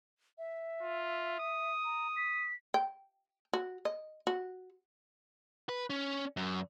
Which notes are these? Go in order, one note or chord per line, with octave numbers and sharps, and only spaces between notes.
E5
F4
D#6
A#5
B6
G5
F#4
D#5
F#4
B4
C#4
F#2